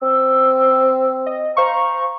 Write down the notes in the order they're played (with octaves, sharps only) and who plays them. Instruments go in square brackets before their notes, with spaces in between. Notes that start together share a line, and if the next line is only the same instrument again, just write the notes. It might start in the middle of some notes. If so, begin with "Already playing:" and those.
[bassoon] C4 [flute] E6
[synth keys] D#5
[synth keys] C5 F5 C#6 [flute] A#5